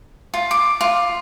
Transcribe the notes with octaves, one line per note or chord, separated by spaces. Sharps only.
F4
D6
F4